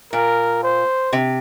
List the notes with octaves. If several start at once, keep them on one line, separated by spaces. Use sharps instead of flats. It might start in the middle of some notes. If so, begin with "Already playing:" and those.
A#2 A#4
C5
C3